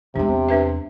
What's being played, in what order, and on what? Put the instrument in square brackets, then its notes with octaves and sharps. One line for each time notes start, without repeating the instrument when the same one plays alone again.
[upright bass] E2 G#3 [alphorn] C3 [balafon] D4
[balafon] D4 B4 E5